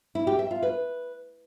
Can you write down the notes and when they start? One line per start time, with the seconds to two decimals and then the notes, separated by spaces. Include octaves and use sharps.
0.15 E4
0.27 G4
0.39 E5
0.51 F4
0.63 B4